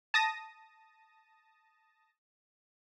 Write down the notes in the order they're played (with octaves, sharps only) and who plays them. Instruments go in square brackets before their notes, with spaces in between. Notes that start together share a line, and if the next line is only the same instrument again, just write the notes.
[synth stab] A5 D#6 A#6